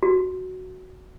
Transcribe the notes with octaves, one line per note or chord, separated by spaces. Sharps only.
F#4